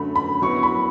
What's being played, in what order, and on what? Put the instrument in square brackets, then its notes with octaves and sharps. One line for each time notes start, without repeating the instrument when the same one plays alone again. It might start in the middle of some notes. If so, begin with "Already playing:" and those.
Already playing: [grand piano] F#2 D3 F#3 A3 [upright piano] B5
[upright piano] B5
[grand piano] F#3 B3 E4 [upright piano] C#6
[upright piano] B5